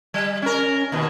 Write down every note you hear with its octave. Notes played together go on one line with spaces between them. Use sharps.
G3
C#4 A#4
D#2 B2